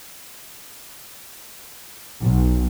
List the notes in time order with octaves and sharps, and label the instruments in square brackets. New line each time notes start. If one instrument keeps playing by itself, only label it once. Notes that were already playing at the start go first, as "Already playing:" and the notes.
[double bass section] B1